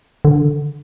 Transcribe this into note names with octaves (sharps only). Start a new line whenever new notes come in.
D3